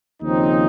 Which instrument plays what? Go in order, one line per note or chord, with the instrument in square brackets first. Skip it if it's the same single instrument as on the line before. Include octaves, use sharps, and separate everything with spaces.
[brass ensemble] D#2 C#3 F3 C4 D#4